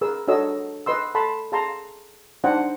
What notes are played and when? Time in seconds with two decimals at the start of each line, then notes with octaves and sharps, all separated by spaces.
0.01 G#4 A#4 B4 E6
0.28 D4 F#4 A4 C#5 D#5 E6
0.86 B4 D#5 C6 E6
1.15 A4 A5 B5 C6
1.52 G#4 F5 A5 A#5 C6
2.44 D4 D#4 C5 F#5 G5